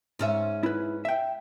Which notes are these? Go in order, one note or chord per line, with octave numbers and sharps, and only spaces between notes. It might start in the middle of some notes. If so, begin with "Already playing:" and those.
G#2 C#4 E5
E4 B4
E5 G5